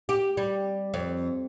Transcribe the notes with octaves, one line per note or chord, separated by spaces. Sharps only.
G4
G3
F2